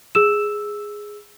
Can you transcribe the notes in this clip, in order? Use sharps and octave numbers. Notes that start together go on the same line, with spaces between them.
G#4 E6 E7